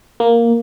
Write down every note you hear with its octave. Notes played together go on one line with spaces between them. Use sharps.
A#3